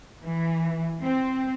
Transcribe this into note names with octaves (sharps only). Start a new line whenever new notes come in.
E3
C4